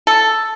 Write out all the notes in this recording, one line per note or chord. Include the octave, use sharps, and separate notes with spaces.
A4